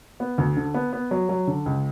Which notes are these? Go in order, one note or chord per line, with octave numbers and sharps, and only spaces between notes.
B3
D2
D3
B3
B3
F#3
F#3
D3
C#2